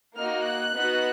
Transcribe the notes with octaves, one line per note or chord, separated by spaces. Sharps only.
A#3 D#4 F#4 F6
F#6
B3 D#4 F#4